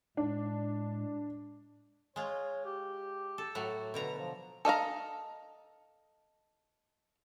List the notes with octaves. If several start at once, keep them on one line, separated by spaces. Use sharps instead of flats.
A2 G#3 D4
G#3 F4 C#5
G4
A4
A2 F#3 F#5
B2 D3 B4 A#5
F3
A4 D#5 F5 A#5